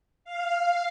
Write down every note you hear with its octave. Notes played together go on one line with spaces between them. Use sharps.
F5